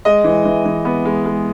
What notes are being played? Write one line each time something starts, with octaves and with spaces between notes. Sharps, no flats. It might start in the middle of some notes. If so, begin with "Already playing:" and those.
G#3 D#5
E3
E3
E3
B3
G#3
G#3